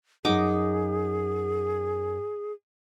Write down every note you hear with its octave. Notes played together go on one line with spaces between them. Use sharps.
F#2 D#4 G#4 F#5 D6